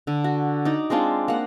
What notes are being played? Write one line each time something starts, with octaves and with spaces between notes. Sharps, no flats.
D3
F#4
D#4 D5
G#3 C4 D4 F4
A#3 F#5